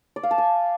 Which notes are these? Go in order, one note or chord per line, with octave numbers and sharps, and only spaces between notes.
D5
F5
A5
G#5